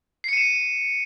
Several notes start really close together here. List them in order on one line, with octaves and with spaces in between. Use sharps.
C7 C#7 D#7 E7